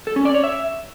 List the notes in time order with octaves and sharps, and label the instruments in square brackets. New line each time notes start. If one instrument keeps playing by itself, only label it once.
[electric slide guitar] A4
C#4
D5
C#5
E5